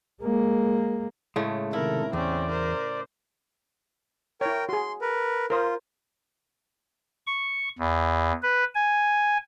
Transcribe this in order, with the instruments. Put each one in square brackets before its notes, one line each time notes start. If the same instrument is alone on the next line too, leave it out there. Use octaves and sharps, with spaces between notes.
[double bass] G#3 A#3
[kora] A2 C#3 A3 [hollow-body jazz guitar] G#3
[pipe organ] C3 D#3 A4 [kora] E4 [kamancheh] A#4
[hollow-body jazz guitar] E2 [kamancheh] C4 C#4 [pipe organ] D5
[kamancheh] A#4 C5
[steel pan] E4 C#5 [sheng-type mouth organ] A#4 G5
[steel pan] F#4 G#4 [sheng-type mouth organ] C6
[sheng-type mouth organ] A#4 B4
[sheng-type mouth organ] F4 [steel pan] A#4 C5 D#6
[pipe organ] C#6
E2
B4
G#5